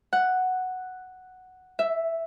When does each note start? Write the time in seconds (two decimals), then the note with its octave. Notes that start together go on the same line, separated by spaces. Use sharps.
0.13 F#5
1.79 E5